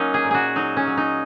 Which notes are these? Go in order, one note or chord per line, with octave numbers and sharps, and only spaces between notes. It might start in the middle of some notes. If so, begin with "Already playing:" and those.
Already playing: F#3 A#3 C#4 D#4
G#4
A#2
F#4 G#4
F#3 D#4
C#4
F#3
D#4